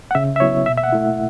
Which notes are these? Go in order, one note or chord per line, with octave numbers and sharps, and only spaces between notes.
F#5
C#3 E5
E5
F#3 B3 E4 C#5
B2 E5
E5
F#5
A3 E4